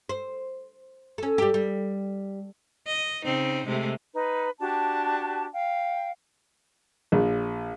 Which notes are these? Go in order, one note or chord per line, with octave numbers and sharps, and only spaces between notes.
C5
C#4 A4
G3 G4
G3
D#5
C#3 C4 D#4
C3 G#3 A3
D#4 B4
D4 F#4 G4 A5
F5 G5
A#1